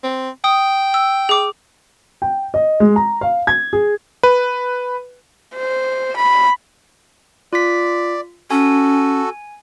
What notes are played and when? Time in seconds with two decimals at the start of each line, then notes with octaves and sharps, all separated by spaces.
0.04 C4
0.44 G5 D#6
0.94 E6
1.29 G#4 D6
2.22 G5
2.54 D#5
2.80 G#3
2.96 A#5
3.21 F5
3.47 G#6
3.73 G#4
4.23 B4
5.55 C5
6.17 B5
7.53 F4 D5 B6
8.51 C#4 F#4 A4 G#5